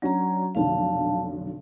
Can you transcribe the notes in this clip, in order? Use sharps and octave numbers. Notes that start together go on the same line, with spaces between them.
F#3 C#4 D4 F#4 A#5
F1 B1 D3 F5 A5